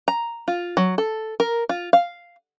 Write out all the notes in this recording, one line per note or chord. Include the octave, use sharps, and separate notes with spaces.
A#5
F4
F#3
A4
A#4
F4
F5